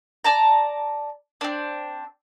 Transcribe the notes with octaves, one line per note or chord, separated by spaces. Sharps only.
D5 A5 A#5
C4 D4